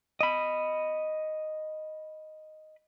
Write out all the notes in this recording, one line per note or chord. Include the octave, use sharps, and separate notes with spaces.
D#5 B5